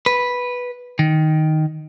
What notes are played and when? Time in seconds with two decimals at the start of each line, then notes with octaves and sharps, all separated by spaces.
0.06 B4
0.99 D#3